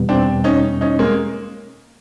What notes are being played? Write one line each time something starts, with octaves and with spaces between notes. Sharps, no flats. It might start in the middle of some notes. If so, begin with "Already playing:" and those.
Already playing: E2 B2 G3 B3
C4 D4
C#4 D#4
C#4 D#4
G#3 A#3